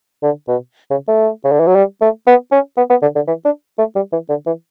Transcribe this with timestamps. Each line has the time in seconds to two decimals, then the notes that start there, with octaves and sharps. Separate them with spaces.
0.23 D3
0.48 B2
0.91 C#3
1.08 A3
1.44 C#3
1.52 D3
1.60 E3
1.67 F#3
1.75 G3
2.01 A3
2.27 B3
2.52 C#4
2.77 B3
2.90 B3
3.02 D3
3.15 D3
3.27 E3
3.45 D4
3.78 A3
3.96 G3
4.12 E3
4.29 D3
4.46 E3